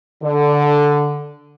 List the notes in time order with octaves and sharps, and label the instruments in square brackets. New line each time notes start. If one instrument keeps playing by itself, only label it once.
[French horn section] D3